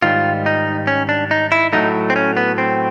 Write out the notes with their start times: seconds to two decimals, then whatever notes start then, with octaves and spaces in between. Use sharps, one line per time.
0.02 G#2 D#3 G3 F4
0.46 D#4
0.87 C#4
1.09 D4
1.31 D#4
1.52 E4
1.73 A2 F#3 A3 D#4
2.10 C4
2.16 C#4
2.37 B3
2.58 C4